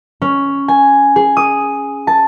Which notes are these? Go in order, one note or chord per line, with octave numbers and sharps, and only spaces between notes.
C#4
G#5
G#4
D#6
A5